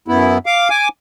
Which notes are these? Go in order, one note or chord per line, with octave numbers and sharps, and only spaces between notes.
F#2 B3 E4
F5 D6
G#5 D6